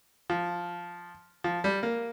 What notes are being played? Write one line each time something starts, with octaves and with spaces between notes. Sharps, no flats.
F3
F3
G3
A#3